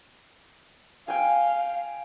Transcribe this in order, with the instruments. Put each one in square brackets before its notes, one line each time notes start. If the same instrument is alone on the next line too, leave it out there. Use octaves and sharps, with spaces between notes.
[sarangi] F5 [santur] G5 G#5